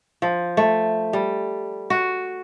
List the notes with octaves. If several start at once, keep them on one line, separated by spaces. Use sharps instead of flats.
F3
A3
G3
F#4